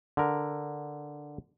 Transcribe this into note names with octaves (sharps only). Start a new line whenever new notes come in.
D3 A#4